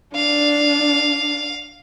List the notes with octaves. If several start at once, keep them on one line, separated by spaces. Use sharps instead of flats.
D4 F5